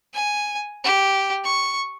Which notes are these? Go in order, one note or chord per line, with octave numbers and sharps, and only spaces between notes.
G#5
G4
C#6